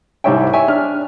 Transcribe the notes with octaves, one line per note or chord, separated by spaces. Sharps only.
C2 G#2 G3 C#5 E5 G5
C#5 E5 G5 G#5
D4 F6